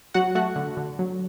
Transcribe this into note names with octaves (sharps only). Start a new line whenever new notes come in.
F#3 F#4 F#5
A3 F#4 F#5
D3
D3
F#3